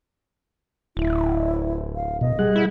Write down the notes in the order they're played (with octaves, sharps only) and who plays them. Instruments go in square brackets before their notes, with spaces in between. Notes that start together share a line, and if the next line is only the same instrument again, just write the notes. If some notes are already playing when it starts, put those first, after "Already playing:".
[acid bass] D1 [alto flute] E4
[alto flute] F5
[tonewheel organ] B2 [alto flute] D#5
[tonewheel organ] G3 G#4 F#5
[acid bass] E4